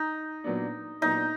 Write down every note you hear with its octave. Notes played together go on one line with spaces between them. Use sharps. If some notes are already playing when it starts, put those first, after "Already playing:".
Already playing: D#4
A#2 F#3 B3 D4
A#2 F#3 B3 D4 D#4